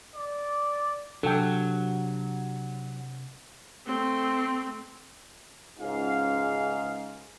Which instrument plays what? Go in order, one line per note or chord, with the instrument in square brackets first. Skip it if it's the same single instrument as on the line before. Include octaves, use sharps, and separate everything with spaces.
[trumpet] D5
[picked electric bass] C3 D4 [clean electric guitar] F#3 [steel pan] A4 G5
[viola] A3 C4
[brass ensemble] C#2 G#2 F5